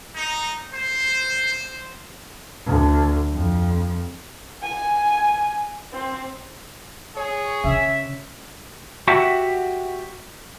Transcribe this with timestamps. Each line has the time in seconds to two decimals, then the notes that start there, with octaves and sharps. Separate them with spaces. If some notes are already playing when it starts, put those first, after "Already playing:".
0.15 D#4
0.74 C5
2.66 D2
3.31 F2
4.62 G#5
5.93 C4
7.17 G#4 C#5
7.64 C#3 E5
9.08 F#4 G4 E5 F#5